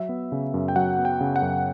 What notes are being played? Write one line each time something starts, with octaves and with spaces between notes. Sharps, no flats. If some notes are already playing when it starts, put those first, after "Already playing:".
Already playing: F#3 E5
B3
C#3
F#2
G5
F#3 F#5
B3
G5
C#3
F#5
F#2